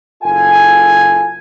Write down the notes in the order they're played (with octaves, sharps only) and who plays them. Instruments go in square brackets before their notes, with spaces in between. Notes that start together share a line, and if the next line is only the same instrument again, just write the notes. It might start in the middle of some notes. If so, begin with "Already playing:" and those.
[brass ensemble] F#1 F4 A4 G#5